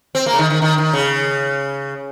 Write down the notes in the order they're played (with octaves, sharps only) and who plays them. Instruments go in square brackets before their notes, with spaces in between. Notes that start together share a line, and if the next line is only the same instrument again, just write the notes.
[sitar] C4
A#3
C#3
D#3
D#3
D#3
D#3
C#3